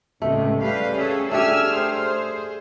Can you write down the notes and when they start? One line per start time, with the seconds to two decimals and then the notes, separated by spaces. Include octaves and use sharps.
0.22 C#2 A2 C3 A3
0.60 G3 B4 F5
0.95 C#4 G#4 A4
1.32 A3 D4 G4 G#5 E6 F6
1.71 G#4 C5